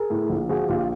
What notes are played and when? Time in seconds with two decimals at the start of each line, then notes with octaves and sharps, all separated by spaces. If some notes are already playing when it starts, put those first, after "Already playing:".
Already playing: G#4 A#4
0.10 A2
0.29 A#1
0.49 F3 F#4 G#4
0.69 A#1 F4 G4